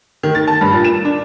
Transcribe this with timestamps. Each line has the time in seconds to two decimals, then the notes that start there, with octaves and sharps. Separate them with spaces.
0.23 D#3
0.35 A6
0.47 A5
0.61 G2
0.73 A#2
0.84 E7
1.05 D4